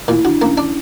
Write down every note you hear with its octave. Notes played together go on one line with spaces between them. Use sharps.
A#2 E4
D4 F#4
A#3 C#4
D4